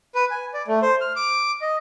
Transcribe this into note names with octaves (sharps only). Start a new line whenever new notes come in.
B4
G#5
D5
A3
C5
F6
D6
D#5